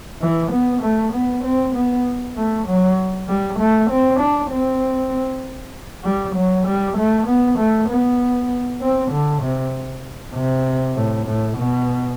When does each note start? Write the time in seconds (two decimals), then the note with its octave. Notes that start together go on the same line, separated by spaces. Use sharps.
0.21 E3
0.51 B3
0.82 A3
1.12 B3
1.43 C4
1.75 B3
2.36 A3
2.67 F#3
3.28 G3
3.59 A3
3.90 C4
4.19 D4
4.51 C4
6.04 G3
6.35 F#3
6.66 G3
6.97 A3
7.26 B3
7.58 A3
7.89 B3
8.80 C4
9.11 D3
9.42 C3
10.34 C3
10.95 A2
11.26 A2
11.57 B2